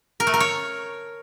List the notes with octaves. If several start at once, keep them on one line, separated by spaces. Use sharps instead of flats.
A#4
A3
A#4
C#5